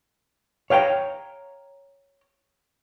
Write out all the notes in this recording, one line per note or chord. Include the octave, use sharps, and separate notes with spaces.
C#5 F5 G5 A5 A#5